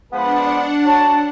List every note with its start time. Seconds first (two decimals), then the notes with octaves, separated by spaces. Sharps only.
0.12 F3 G#3 B3 D4 B4 F#5
0.85 F#3 A5